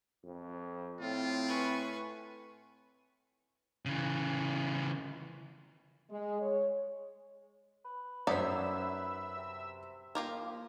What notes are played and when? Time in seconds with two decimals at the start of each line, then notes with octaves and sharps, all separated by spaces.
0.24 F2
1.01 A2 C4 F4
1.46 B4 G#5 C#6
3.85 C#3 E3
6.11 G#3
6.42 C#5
7.85 B4
8.27 F#2 C#4 D#4 C5 D5 E5 E6
9.36 C3
10.15 F3 A#3 F4 G4 A#4